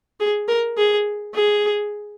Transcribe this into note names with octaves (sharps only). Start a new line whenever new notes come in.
G#4
A#4
G#4
G#4